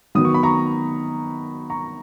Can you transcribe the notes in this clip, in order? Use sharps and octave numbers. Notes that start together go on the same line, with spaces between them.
D#3 F#3 B3 D#6
C#6
B5
A#5 C#6
A#5 C#6